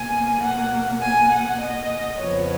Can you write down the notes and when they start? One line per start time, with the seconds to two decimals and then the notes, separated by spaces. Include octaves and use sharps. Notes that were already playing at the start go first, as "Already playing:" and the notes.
Already playing: B2 A#3 G#5
0.42 F#5
1.01 G#5
1.30 F#5
1.60 D#5
2.18 F2 C#3 F3 B3 C#5